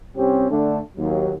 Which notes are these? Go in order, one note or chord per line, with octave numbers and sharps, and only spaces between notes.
C2 C4 C#4 G4
D3 A3 D4
D#2 F#3